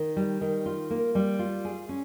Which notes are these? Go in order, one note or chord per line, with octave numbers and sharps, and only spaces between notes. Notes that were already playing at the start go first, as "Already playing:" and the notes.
Already playing: D#3
G3
D#3
F4
A#3
G3
F4
G#4
C#4